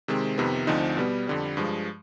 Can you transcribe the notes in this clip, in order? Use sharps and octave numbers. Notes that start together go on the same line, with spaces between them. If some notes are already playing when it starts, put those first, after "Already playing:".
C3 D#3 G#3 C4
F2 C3 D#3 B3
D2 D3 F3 C4 D#4
B2 G3 B3
F2 D3 G3
G2 F3 G#3